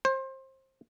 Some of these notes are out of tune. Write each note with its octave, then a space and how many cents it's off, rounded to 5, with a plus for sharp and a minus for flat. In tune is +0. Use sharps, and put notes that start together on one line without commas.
C5 +25